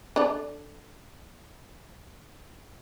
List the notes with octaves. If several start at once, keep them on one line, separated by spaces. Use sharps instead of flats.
D4 A4 D5